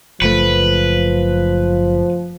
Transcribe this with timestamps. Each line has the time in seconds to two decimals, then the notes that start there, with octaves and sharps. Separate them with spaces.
0.22 F#1 F3 A3 B4